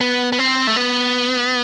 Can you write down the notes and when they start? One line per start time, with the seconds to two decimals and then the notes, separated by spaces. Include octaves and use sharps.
0.01 B3
0.32 B3
0.39 C4
0.67 A3
0.76 B3